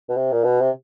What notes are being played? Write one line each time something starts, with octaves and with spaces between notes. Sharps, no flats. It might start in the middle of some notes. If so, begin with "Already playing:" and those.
B2
C3
A#2
B2
C3